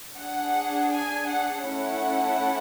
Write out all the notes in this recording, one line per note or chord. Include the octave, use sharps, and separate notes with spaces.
D4 G#4 F#5
G#5
F#5
A3 C#4 E4 F#5